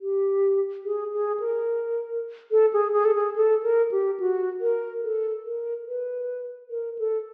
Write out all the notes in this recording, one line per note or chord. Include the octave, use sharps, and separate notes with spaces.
G4
G#4
G#4
A#4
A4
G#4
G#4
A4
G#4
A4
A#4
G4
F#4
A#4
A4
A#4
B4
A#4
A4